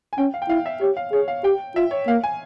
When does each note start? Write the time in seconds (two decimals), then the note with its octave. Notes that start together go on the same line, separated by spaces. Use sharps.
0.13 G#5
0.18 C#4 G5
0.34 F5
0.42 G5
0.49 E4 F5
0.66 E5
0.81 G4 C#5
0.97 F5
1.12 G#4 C#5
1.28 F5
1.44 G4 G5
1.76 F4 E5
1.91 C#5
2.07 A#3 F5
2.24 G#5